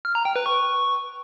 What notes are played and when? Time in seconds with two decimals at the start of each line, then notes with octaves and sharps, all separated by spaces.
0.05 F6
0.15 A#5
0.25 G5
0.36 B4
0.46 C#6